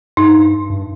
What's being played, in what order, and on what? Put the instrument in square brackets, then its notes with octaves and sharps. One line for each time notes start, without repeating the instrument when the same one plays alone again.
[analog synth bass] G2 [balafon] D#4
[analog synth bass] G2